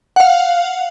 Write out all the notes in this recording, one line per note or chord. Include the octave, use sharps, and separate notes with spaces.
F5 F#5